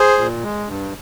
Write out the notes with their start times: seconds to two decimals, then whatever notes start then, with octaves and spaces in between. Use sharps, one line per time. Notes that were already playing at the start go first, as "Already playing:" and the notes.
Already playing: G#4 C5
0.18 A#2
0.43 G#3
0.68 G2